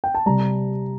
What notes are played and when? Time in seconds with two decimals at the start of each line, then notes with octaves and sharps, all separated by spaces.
0.04 G5
0.15 A5
0.26 C3 G3 A#5